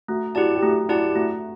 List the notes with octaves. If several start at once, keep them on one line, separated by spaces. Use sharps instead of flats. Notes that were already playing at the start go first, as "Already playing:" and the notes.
A3 F#4
E4 F#4 G4 D5 A5
G4
A3 F#4
E4 F#4 G4 D5 A5
A3 F#4